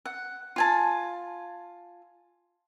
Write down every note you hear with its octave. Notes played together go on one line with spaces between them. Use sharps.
F#5
F4 G#5 A5